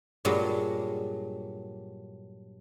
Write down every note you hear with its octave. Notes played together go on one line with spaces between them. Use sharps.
G2 A#2 F#3 G#3